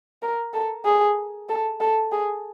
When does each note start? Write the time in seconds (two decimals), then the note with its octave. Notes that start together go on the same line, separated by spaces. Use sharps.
0.22 A#4
0.54 A4
0.85 G#4
1.49 A4
1.80 A4
2.12 G#4